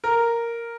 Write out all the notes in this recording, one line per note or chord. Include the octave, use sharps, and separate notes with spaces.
A#4